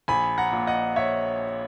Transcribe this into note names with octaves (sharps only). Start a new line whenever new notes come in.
A#1 G#5 B5
F#5 A#5
A#2
D#5 F#5
C#5 E5